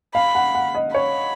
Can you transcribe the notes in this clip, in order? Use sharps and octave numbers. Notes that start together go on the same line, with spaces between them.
F5 B5
F#5
F#5
D#5
C#5 B5